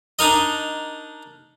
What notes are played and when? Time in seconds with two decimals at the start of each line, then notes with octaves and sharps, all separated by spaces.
0.19 D4 D#4 A#4 D#5